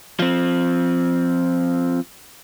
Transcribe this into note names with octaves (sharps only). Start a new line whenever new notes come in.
F3 C4